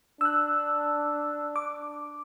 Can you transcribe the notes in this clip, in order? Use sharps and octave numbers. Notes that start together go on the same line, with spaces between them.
D4 E6 F#6
D6